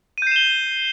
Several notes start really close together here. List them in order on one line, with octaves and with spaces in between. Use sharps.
D#7 G6 C7 E7 G7